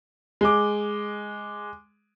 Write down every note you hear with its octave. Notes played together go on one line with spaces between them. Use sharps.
G#3 D6